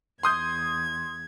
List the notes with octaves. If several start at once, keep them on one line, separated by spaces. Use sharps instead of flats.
E2 C6 D#6 G6 G#6